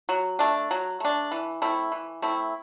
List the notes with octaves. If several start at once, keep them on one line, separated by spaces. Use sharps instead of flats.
F#3
A3 D4
F#3
A3 D4
E3
A3 C4 E4
E3
A3 C4 E4